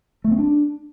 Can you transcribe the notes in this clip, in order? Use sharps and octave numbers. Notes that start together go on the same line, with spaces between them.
A3
C4
D4